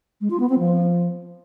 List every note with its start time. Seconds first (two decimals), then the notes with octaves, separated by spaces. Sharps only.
0.21 G#3
0.30 F4
0.40 B3
0.49 C4
0.59 F3